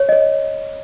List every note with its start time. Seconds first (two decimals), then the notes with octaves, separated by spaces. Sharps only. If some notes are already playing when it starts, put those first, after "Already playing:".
Already playing: C#5
0.09 D#5
0.12 C#5